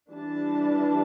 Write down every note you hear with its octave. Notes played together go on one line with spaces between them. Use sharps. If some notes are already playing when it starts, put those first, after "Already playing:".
E3 G3 D4 A5